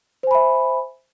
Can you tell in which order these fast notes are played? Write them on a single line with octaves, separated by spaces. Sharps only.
C5 G#5 B5 E5